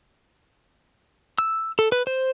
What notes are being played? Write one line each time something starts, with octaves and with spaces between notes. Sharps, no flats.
E6
A4
B4
C5